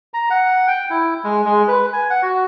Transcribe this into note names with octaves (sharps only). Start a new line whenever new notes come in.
A#5
F#5
G5
E4
G#3
G#3
B4
G#5
F#5
F#4